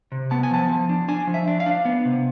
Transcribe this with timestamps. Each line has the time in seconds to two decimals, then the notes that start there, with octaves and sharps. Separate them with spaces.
0.12 C3
0.31 B3 A5
0.43 G#5
0.51 F3 A5
0.70 F3
0.89 D4
1.08 D4 G#5
1.27 F3
1.34 E5
1.48 D4
1.60 F5
1.66 D4
1.85 B3
2.05 C3